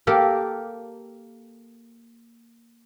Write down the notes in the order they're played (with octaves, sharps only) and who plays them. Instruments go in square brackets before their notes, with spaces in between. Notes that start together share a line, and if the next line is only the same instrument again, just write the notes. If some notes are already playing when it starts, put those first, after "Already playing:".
[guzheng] A#3 G4 A4 A#4